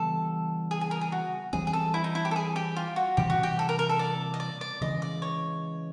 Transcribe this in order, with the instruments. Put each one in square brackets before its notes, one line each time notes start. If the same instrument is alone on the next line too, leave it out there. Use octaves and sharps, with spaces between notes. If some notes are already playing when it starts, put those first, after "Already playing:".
Already playing: [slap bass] C#3 E3 G3 B3 [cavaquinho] A4
[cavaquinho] G#4
G#4
A#4
G#4
F#4
[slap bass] E3 G3 C4 [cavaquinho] G#4
[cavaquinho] G#4
A4
E4
D#4
E4
G4
A4
G#4
G4
F4
F#4
[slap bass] C3 E3 G3 A#3 [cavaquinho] G4
[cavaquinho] F#4
G4
A4
A#4
A#4
A4
D5
D#5
D5
D5
[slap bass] C#3 E3 G#3 [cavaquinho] D#5
[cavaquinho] D5
C#5